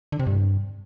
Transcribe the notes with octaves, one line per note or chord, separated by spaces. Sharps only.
D3
C3
G2